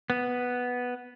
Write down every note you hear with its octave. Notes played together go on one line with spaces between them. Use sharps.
B3